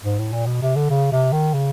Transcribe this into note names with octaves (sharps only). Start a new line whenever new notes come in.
G#2
A2
A#2
B2
C3
D3
C#3
C3
D#3
C#3